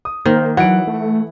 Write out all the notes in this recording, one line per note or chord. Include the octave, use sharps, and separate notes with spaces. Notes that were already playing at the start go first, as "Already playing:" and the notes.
D#6
D#3 A#3 A#4 C5
E3 F#3 F#5 D7
A3